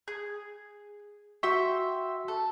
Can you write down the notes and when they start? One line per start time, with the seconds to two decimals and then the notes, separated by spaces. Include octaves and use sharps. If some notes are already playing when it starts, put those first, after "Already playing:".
0.08 G#4
1.43 F#4 E5 G5 C6 C#6
2.28 A4